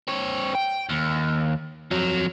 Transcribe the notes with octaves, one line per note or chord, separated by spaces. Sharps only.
C4 C#5
G5
D#2
F2 F#3